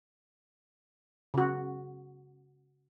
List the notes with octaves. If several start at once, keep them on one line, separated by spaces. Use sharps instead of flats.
C#3 F#4